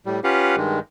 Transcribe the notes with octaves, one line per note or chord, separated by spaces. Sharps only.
A2 G3
C#4 F4 G4 B4 F5 F#5
G2 D#3 G#3